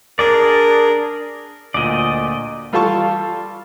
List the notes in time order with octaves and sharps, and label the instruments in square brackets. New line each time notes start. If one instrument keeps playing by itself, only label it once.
[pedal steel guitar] D4 G#4 D5 [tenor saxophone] A#4
[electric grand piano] D2 A#2 [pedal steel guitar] D5 D#5
[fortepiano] G3 F4 A4 F5 A5 C#6